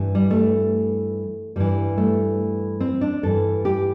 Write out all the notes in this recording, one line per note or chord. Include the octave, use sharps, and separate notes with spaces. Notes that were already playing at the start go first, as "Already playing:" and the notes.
Already playing: G2 E3
G3
A3
G2 E3 G3
A3
C4
D4
G2 E3 A4
G4